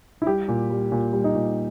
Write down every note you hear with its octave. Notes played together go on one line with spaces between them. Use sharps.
E4
G3 G4
A#2
G3
A#2
G3
D#4
A#2